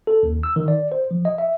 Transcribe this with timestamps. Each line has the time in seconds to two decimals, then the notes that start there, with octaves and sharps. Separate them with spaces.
0.07 A4
0.23 D#2
0.43 E6
0.56 D#3
0.68 D5
0.92 C5
1.11 F3
1.25 D#5
1.38 E5